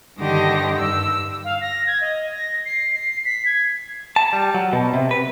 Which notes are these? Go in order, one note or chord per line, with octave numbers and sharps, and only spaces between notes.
G2 D3 D#3 G4 D#5 A#6
G2 E6
F5
A#6
G#6
D#5
A#6
C7
C7
B6
G#6
A5
G3
F#3
B2
C3
B4